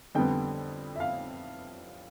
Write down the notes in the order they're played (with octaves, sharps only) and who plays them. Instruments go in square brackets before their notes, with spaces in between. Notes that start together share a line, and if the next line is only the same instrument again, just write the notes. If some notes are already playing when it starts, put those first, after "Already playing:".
[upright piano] F2 D3 G3 B3 G5
E5
F5